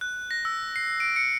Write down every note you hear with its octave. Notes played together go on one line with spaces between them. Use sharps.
F#6
A#6
E6
C7
D7
C#7